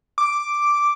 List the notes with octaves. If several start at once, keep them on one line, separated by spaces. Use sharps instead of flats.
D6